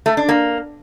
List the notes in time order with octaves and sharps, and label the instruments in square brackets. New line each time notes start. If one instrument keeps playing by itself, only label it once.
[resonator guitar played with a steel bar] A3
D4
A#3